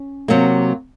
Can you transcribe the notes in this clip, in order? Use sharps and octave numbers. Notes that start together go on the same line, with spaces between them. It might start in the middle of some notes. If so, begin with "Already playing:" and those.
Already playing: C#4
C3 F#3 A#3